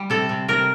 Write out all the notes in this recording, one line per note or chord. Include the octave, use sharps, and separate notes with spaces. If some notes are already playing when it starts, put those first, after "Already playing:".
Already playing: G3
C3 A4
C3
C3 A#4